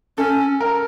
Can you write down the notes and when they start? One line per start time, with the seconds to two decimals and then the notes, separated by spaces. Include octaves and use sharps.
0.18 C#4 A4
0.60 A#4